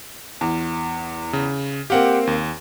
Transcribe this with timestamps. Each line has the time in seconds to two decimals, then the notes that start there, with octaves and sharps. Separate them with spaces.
0.41 E2
1.33 C#3
1.90 A#3 C4 G4 F5 F#5
2.27 D#2